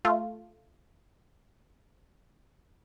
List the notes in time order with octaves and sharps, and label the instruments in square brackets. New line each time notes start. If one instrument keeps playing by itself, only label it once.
[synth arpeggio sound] A3 F4